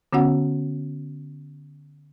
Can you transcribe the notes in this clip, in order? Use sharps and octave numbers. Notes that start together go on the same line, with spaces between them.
D3 B3 C#4 F#4 F#5